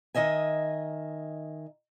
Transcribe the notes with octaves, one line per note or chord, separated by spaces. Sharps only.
D#3 D#5 E5 G#5